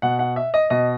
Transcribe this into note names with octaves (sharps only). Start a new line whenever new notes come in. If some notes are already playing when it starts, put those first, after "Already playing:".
B2 F#5
F#5
E5
D#5
B2 D#5